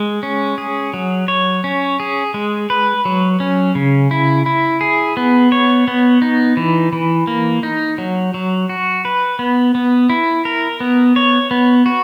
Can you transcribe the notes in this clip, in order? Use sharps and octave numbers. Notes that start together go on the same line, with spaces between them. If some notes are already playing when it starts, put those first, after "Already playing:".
Already playing: G#3
C#4
G#4
F#3
C#5
C#4
G#4
G#3
B4
F#3
C#4
C#3
E4
E4
G#4
B3
C#5
B3
D#4
E3
E3
A#3
D#4
F#3
F#3
F#4
B4
B3
B3
E4
A#4
B3
C#5
B3
F#4